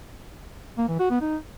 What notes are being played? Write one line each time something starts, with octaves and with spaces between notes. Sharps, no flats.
A#3
E3
F#4
B3
D#4